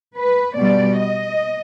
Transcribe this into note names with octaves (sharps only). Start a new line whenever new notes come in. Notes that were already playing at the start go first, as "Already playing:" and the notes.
B4
B2 G3 D5
D#5